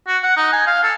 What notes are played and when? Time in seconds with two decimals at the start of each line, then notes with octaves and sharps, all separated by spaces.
0.07 F#4
0.23 F#5
0.37 D#4
0.52 G#5
0.67 F5
0.83 A4